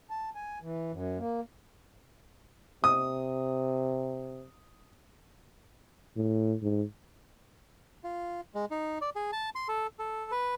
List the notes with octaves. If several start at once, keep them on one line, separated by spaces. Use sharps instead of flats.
A5
G#5
E3
F#2
A#3
C3 D#6
A2
G#2
F4
G#3
D#4
D5
G#4
A5
C6
A4
A4
B4